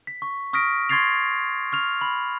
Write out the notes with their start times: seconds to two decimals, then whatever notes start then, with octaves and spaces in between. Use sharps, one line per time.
0.07 B6
0.22 C#6
0.53 C#6 D#6 F6 A#6 B6 D7
0.89 C6 C#6 G#6 A6 C7 F7
1.72 C#6 F6 F7
2.01 B5